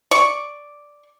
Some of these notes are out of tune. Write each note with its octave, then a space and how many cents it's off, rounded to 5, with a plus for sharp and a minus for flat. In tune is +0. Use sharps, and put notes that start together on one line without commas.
D5 +0 C#6 -5